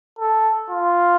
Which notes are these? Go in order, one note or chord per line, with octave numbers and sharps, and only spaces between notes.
A4
F4